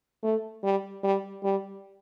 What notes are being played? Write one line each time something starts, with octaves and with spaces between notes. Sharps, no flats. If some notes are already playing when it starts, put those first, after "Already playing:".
A3
G3
G3
G3